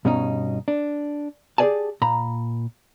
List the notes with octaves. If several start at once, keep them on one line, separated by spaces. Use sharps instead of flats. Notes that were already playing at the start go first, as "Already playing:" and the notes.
G2 B2 C#4 D#4
D4
G4 G#4 A#4 D5 G#5 A5
A#2 A#5 B5